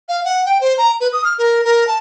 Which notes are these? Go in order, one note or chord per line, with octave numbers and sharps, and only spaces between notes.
F5
F#5
G5
C5
A#5
B4
D#6
F6
A#4
A#4
A5